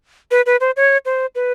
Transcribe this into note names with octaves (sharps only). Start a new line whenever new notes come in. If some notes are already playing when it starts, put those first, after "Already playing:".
B4
B4
C5
C#5
C5
B4